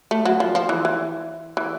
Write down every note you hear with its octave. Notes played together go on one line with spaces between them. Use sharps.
A3
F#3
F3
F3
E3
E3
E3